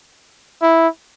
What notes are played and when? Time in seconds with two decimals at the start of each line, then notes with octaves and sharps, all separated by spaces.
0.62 E4